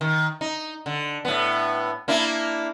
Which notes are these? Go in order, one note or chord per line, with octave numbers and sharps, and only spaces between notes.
D#3
D#4
D3
A2 B3
A#3 D4 E4